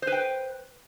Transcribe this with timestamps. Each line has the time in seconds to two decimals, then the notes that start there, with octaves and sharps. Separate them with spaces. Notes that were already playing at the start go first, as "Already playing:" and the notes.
0.02 C5
0.07 B4
0.12 G5